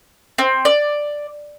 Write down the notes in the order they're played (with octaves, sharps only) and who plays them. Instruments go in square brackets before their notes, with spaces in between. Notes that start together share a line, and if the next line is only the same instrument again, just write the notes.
[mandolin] C4
D5